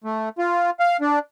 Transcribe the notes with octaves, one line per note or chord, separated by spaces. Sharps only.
A3
F4
F5
D4